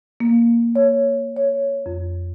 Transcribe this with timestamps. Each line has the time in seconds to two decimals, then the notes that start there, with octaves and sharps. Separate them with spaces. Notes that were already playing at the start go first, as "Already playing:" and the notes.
0.20 A#3
0.76 C#5
1.37 C#5
1.86 F2